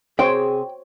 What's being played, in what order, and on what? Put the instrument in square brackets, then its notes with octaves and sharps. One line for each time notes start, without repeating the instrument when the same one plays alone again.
[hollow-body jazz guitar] C3 C4 C6 [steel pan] F#4 C5 C#5 [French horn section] G#4 [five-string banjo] G5